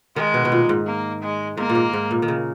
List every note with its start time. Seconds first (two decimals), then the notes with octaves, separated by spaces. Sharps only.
0.16 D#3 G#3
0.34 B2
0.45 B2
0.52 A#2
0.69 G#2
0.87 A#3
1.22 G#3
1.57 G#2 A#3
1.69 A#2
1.75 G#2
1.93 G#2
2.11 A#2
2.22 D#3
2.28 C#3